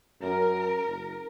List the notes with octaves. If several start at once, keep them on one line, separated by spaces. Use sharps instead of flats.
F#2 A#4
F#1